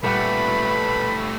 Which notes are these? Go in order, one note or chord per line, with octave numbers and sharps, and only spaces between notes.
A#2 G3 A3 G4 B4 F#5 B5